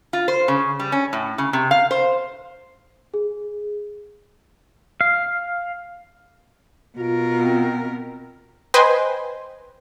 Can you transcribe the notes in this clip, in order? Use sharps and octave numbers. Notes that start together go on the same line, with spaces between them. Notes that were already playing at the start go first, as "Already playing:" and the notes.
F4
C5
C#3
G3
C#4
A2
C#3
C3
F5
C5
G#4
F5
B2 F4 A#4
C4
B4 C5 D#5 G5 G#5 C6